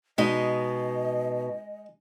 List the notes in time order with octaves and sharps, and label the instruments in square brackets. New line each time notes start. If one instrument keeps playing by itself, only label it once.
[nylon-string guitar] B2 D#4 [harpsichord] G#3 [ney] D#5